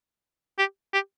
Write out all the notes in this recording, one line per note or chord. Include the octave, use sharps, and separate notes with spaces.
G4
G4